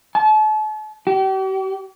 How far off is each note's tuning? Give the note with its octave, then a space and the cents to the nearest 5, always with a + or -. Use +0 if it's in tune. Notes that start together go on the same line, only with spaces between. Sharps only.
A5 -40
G4 -40